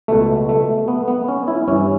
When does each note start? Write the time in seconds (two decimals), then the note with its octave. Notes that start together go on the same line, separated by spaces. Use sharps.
0.08 C#2 B2 A3
0.49 A3
0.88 B3
1.08 B3
1.28 C#4
1.48 E4
1.68 G2 E3 C#4